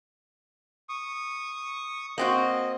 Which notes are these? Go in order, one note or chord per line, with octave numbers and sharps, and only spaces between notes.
C#6 D#6
A#3 C4 F#4 D#5